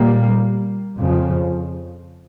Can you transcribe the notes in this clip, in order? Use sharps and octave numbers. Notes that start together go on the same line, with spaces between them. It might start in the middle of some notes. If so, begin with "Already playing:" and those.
Already playing: A#2 G3 A#3
F2 C#3 F3